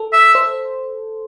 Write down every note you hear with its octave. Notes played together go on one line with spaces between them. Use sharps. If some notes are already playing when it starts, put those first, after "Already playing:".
Already playing: A4
E5
C5